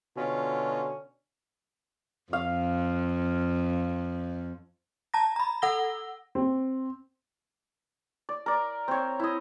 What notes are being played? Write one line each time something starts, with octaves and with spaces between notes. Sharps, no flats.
B2 D3 C#4 F4
F2 F5
A5 A#5 A#6
A#5 B5
A4 F#5 E6 A#6 G7
C4
D5
A#4 D5
C4 C#5
E4 D#5